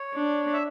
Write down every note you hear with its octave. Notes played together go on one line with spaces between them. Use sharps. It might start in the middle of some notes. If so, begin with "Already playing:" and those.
Already playing: C#5
D4
E5